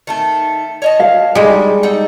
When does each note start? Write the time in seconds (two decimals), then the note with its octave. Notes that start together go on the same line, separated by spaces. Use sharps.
0.07 D#3 A3 A4
0.82 C#5 D#5 A5
1.00 F5
1.35 G3 G#3 D#4 G#4
1.83 D#4 A4 F#5